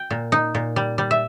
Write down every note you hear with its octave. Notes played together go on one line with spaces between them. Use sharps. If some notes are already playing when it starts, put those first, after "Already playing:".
Already playing: G5
A#2
D#4
A#2
G3
G3
E5